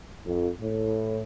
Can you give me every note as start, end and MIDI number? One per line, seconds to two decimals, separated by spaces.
0.24 0.47 41
0.60 1.22 45